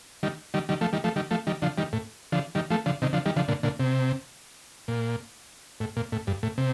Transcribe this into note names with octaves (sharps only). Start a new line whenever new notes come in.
D#3 G3
D#3 G3
D#3 G3
F3 A3
D#3 G3
F3 A3
D#3 G3
F3 A3
D#3 G3
D3 F3
D#3 G3
A2
D3 F3
D#3 G3
F3 A3
D3 F3
C3 D#3
D3 F3
D#3 G3
D3 F3
A#2 D3
A#2 D3
C3
A#2
A2
A#2
A2
G2
A2
C3